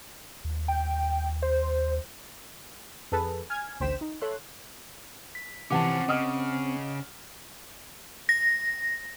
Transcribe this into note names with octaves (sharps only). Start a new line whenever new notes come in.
D#2
G5
C5
F2 G#4 A4 B4 A5
G#5 F6 G#6
A1 D2 C5 G5 B6 E7
D#4
A4 C#5 E5 C6 F#6
B6
C3 E3 F3 C4 C#4 F#5 A5 D6
C#3 D#5 D#6 F6
A#6